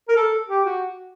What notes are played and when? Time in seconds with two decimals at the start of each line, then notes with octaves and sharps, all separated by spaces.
0.09 A#4
0.16 A4
0.48 G4
0.65 F#4